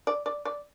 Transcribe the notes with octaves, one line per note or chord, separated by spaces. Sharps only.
D5
D5
D5